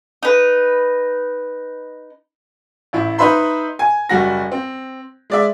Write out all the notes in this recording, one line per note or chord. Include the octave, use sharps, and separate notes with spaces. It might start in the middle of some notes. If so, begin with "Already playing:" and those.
D#4 B4
A1 E4
D#4 B4 C5 E5 B5 C6
G#5
F#1 G3 F#4 A#6
C4
G#3 D5 E5